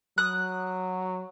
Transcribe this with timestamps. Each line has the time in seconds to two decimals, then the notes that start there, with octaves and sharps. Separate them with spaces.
0.18 F#3 D#6 F#6